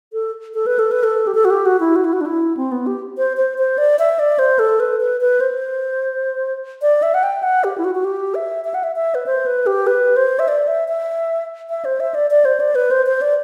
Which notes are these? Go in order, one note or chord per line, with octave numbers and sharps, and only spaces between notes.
A4
A4
B4
A4
B4
A4
G4
A4
F#4
G4
F#4
E4
F#4
E4
F#4
D4
E4
C4
B3
G4
C5
C5
C5
D5
E5
D5
C5
A4
B4
B4
B4
C5
D5
E5
F#5
G5
F#5
G4
E4
F#4
F#4
G4
E5
E5
F#5
E5
E5
B4
C5
B4
G4
B4
C5
E5
D5
E5
E5
E5
C5
E5
D5
D5
C5
D5
B4
C5
C5
D5